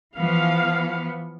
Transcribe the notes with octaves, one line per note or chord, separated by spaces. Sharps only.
E3 F3 B3 F5